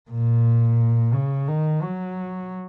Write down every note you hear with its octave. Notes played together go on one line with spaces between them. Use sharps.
A#2
C#3
D#3
F#3